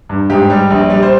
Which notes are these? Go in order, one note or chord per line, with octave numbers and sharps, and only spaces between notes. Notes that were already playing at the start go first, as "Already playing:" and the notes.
G2
G#2 G4
G3
A#1
G3
C5